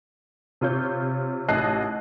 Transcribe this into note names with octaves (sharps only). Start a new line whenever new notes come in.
C3 F4 C#5 G6
A1 D#5 A5 F#6 C7